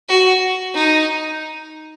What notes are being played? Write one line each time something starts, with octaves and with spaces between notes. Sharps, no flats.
F#4
D#4